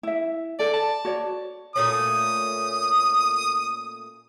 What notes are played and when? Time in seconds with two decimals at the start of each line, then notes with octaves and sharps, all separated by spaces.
0.03 E4 E5
0.59 A4 D5
0.73 A5
1.05 F#4 C#5 D5
1.76 A#2 A3 C#4 D#6